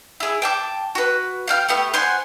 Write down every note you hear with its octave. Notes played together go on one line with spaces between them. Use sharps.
E4 G#4
G5 A5 D6
F#4 B4
F5 G5 F6
A3 B3 G4
C5 F#5 G#5 C6